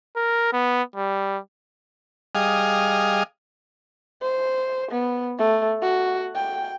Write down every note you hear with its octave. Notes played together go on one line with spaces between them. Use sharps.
A#4
B3
G3
G3 G#4 D#5 F5
C5
B3
A3
F#4
G5